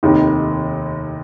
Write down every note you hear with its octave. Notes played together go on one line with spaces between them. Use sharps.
F1 D#2 D#3